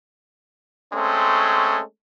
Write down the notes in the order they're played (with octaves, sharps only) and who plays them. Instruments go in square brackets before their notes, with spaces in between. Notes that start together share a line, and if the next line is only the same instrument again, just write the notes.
[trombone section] G#3 A3 C4 C#4